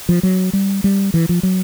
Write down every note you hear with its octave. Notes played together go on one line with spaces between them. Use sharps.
F3
F#3
G3
G3
E3
F3
F#3